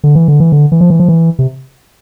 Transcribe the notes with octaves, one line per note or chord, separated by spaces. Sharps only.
D3
E3
D3
E3
D3
E3
F3
E3
F3
E3
C3